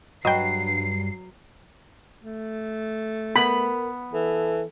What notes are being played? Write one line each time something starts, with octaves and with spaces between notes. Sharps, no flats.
G2 F#3 B4 D#5 G5 C7
A3
B3 A#4 B5
E3 A4